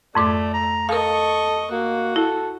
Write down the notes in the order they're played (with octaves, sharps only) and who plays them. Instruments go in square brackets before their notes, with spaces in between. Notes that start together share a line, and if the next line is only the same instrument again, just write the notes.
[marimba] F2 G#2 D6 [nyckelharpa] A3 [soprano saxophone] D5
[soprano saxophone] A#5
[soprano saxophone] A4 [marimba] A#4 F5 [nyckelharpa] D#5 C#6
[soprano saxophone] A#3 [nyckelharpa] F#4
[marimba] E4 [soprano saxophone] A4